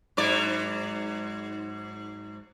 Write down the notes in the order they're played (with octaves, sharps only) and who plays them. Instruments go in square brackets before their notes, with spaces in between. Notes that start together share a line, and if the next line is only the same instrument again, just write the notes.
[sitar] G#2 F#3 D5